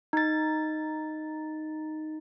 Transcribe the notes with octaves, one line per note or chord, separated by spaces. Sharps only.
D#4 A6